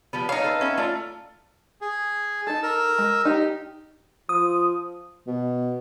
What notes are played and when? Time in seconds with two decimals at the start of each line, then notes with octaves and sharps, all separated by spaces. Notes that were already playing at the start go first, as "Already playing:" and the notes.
0.13 F3 G3 B3
0.29 D#4 C#5 F5
0.44 A4 B4
0.60 B3 C#4 E5
0.77 A3 F4 D5
1.81 G#4
2.47 D#4 A4 A5
2.63 A#4 E6
2.98 G#3
3.25 D#4 G4
4.29 F3 D#6
5.27 B2